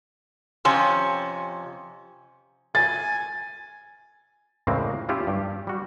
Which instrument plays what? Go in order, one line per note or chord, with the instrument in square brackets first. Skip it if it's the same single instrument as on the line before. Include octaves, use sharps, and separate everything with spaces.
[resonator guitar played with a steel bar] F2 C3 C#4
[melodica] G#5 [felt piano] A6
[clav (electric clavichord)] E2 A2 C#3 G#3 A#3 C4
C#4 E4 F4 G4
G2 G4
G3 F#4